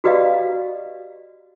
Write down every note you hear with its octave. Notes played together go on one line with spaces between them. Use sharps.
F#4 G4 B4 D5 D#5 F5